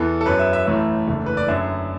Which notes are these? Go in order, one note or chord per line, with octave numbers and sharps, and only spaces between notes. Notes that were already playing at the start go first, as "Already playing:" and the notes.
Already playing: E2 E3 B3 A4
A4
F#2 F#3 B3 B4
E5
E5
A1 A2 A3 E5
F#1 E2 D3 A3
B4
D5
F#2 D3 F#3 E5